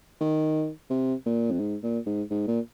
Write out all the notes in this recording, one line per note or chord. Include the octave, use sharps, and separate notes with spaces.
D#3
C3
A#2
F2
G#2
A#2
G#2
G#2
A#2